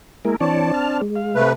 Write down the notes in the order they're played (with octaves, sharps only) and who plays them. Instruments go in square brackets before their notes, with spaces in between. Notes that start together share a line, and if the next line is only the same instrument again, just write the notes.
[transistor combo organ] G#3 [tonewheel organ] A#3 E4 A#4
[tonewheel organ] E3 C#5 D5 [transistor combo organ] C4 D4 [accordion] A5
[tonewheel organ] F6
G#3
[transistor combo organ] F5
[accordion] C3 A3 B4